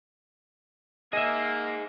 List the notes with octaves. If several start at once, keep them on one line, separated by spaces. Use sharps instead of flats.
A#3 D#4 G#4 D#5 E5